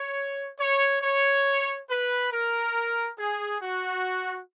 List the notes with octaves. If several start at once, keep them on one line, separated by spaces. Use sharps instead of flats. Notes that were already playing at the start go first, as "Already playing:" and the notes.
Already playing: C#5
C#5
C#5
B4
A#4
G#4
F#4